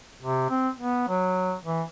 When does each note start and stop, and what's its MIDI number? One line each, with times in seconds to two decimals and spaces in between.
0.22 0.49 48
0.50 0.69 60
0.77 1.07 59
1.09 1.54 54
1.65 1.82 52